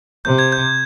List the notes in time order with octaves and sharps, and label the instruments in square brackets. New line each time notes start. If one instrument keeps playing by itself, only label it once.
[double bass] C3 [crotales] G6
[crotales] G#6
G6